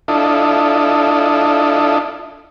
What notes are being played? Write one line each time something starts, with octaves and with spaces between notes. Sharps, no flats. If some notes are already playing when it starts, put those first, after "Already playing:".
D4 E4 F4 A4 D#5